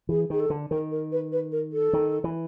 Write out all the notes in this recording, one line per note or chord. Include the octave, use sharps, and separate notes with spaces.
E3 G#4
D#3 G#4
A4
D3
D#3 A#4
A#4
B4
B4
A#4
A4
D#3
E3